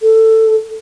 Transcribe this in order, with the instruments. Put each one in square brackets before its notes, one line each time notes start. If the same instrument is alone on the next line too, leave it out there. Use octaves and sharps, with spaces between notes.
[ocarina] A4